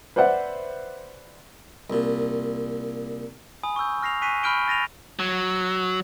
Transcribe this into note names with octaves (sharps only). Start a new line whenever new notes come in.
B4 C5 D5 E5 F#5
C2 A#2
G#5 B5 D#6
C#6 D#6 E6 G6
C#6 F6 A#6 C7 F7
G#5 C#6 F#6 B6 C7 D#7
B5 C#6 F6 G6 D7 G7
A6 A#6 D#7 F7
F#3